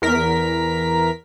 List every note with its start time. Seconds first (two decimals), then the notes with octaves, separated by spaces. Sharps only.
0.02 E2 A#4 B6